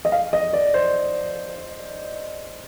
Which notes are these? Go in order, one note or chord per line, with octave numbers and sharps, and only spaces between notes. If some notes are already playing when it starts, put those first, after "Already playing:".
D#5
F5
D#5
D5
C5